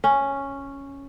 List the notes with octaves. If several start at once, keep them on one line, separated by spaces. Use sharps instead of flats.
C#4